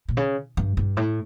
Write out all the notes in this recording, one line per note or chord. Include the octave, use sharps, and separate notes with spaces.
A#2
C#3
G2
G2
A2